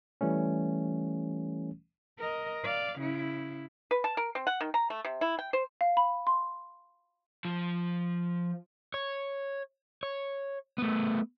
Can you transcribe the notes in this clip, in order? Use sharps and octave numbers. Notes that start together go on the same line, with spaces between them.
E3 G3 A3 C#4
A#4 D#5
D5 F5
C#3 E4
B4
A5
A#4
C4
F#5
D#3
A#5
A3
C3
E4
G5
C5
F5
B5
C6
F3
C#5
C#5
A3 B3